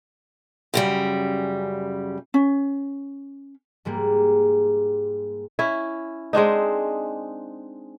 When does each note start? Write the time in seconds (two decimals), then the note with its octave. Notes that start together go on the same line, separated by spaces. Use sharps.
0.74 F#2 C#3 G3
2.34 C#4
3.85 G#2 G3 G#3 A#3
5.59 C#4 E4
6.33 G#3 C4 D4 D#4